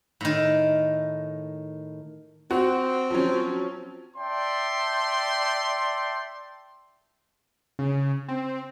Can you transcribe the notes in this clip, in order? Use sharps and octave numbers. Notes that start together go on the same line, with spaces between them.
A2 D#3
C4 F#4
F3 F#3 C#4
D5 E5 G5 A5 C6
C#3
C4